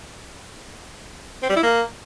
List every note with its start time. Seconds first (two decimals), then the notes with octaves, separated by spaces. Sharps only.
1.43 C4
1.50 G3
1.56 E4
1.63 A#3